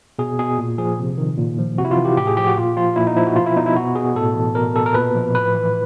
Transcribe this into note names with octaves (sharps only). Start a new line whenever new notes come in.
B2 G#4
B2 G#4
A#2
F3 G#4
C3
D#3
A#2
F3
C3 F#4
E4
F4
E3
G4
A2 G4
G#4
F3 G4
F#4
A#2 F4
F3 F4
A#2 E4
D#4
F3 E4
F#4
B2 F4
E4
B2 D#4
E4
B2 F#4
B2 G#4
A2 A4
E3
B2 A#4
B2 A4
A#4
A#2 B4
F3
A2 B4
E3